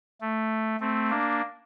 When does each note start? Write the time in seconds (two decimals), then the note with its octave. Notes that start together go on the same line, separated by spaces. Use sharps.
0.21 A3
0.80 A3 C4
1.10 A#3 D4